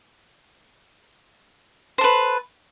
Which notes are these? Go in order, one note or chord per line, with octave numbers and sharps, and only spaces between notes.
A4 B4 C5